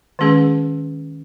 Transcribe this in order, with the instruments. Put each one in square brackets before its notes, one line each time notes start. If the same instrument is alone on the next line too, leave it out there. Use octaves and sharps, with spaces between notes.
[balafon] D#3 G#3 C#4 G#4 B4